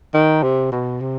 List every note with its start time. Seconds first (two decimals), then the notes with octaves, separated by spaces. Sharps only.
0.14 D#3
0.43 C3
0.72 B2
1.01 C3